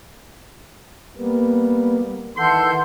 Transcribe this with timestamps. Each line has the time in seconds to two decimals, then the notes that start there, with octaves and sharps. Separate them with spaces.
1.17 G3 A#3 B3
2.37 D#3 E3 A4 F#5 C6 G6